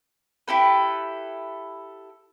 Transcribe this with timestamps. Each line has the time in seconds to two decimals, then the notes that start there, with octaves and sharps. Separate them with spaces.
0.48 E4 G4 A4 B4